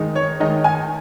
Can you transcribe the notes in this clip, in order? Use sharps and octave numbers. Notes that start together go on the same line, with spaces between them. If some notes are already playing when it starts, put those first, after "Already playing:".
Already playing: D#3 G#3 D#4
C#5
D#3 G#3 D#4 D#5
G#5